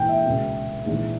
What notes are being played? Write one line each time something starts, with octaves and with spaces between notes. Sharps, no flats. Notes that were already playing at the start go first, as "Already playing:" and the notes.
Already playing: A#1 G#2 E3 G5
E5
C#2 B2
A#1 G#2 E3